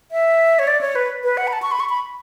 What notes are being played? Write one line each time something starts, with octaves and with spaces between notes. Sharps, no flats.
E5
C#5
D5
C#5
B4
B4
F#5
B5
A5
C#6
B5
C#6
B5